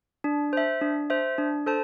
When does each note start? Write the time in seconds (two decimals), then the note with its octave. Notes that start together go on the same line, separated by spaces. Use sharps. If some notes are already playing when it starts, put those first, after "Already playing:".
0.24 D4
0.53 C5 E5
0.81 D4
1.10 C5 E5
1.38 D4
1.66 A4 C5 A5